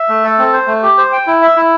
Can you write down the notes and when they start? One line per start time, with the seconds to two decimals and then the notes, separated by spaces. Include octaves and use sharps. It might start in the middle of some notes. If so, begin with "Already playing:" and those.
Already playing: E5
0.09 A3
0.24 A4
0.39 C4
0.53 C5
0.67 A3
0.82 G4
0.98 C5
1.13 G5
1.27 E4
1.42 E5
1.56 E4